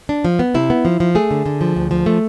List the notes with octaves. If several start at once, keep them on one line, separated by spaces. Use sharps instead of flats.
D4
F3
B3
C3 E4
B3
F3
F3
A3 G#4
D3
D3
F3
D2
F3
A3